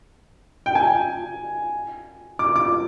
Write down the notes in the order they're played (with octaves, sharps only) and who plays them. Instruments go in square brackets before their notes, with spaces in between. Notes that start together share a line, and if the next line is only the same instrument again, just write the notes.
[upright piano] G5
G#5
D6
D6